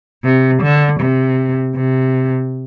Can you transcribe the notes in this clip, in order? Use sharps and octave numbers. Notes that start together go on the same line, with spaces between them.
C3
D3
C3
C3